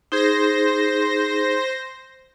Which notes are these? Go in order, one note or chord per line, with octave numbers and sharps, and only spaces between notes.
D#4 G#4 C5 A#6